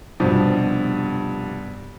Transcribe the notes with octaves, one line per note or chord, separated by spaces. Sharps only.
F1 G2 B2 F3